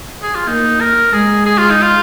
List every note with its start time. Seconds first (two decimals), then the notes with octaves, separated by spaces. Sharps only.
0.23 G#4
0.35 F4
0.48 A#3 D#4
0.81 A#4
1.13 G#3 G#4
1.46 G#4
1.58 F4
1.70 D#4
1.82 F4